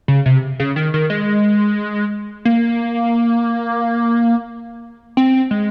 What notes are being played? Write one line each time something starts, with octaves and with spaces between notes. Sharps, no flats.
C#3
C3
C#3
D#3
D#3
G#3
A#3
C4
G#3